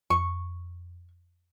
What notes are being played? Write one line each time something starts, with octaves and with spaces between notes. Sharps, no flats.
F2 C#6